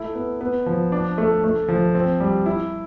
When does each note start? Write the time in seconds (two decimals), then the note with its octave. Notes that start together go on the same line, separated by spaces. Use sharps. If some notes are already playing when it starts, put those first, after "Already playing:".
Already playing: A3 E4
0.15 B3
0.41 B3
0.66 F3
0.92 D4
1.18 A3
1.44 A3
1.68 F3
1.95 C4
2.20 G3
2.46 E4